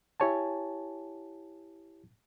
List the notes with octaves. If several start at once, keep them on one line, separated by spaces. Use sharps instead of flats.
E4 G4 C#5 G#5 A5